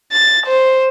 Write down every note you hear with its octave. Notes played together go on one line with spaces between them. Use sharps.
A6
C5